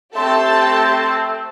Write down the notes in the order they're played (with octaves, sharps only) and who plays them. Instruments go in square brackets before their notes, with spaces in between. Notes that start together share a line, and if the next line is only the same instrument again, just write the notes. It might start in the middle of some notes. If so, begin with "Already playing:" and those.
[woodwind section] A3 C4 [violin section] G4 A4 A5 [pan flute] C6